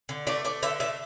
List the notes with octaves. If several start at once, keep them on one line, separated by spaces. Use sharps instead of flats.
D3
A3 D5
A3 D5
D3 E5
A3 E5